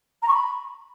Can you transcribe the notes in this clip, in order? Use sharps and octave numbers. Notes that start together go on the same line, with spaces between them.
A#5
C#6
B5